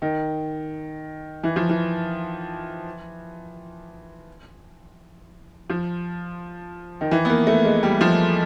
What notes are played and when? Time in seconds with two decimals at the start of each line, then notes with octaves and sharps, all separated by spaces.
0.02 D#3
1.43 E3
1.56 F3
1.69 E3
5.70 F3
7.01 D#3
7.11 E3
7.25 B3
7.30 A#3
7.47 A3
7.65 G#3
7.83 G3
8.01 F3